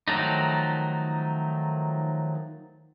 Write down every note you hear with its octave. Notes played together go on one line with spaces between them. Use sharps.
D#3 F3 F#3 A3 D#4